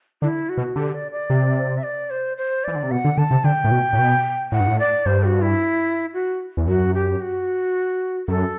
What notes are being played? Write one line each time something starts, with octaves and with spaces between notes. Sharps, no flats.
D3 E4
F#4
B2
D3 G4
D5
D5
C3
E5
D5
C5
C5
E3 D5
D3
C3
B2 F#5
D3
D3 A5
C3
D3 G5
A2
B2
A2
B2
A2 F#5
G2
A2
D5
G2 C5
F#4
E4
F#4
E2
F#2 F#4
G4
F#4
F#2 A4